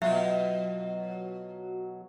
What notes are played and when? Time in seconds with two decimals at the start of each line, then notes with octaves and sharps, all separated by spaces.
0.02 B2 F#3 F4 E5